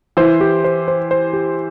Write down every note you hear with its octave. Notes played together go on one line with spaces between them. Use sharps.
E3 C5
G4
C5
C5
C5
G4